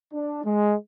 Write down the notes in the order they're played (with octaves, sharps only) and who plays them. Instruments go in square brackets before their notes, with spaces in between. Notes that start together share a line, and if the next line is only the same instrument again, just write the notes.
[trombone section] D4
G#3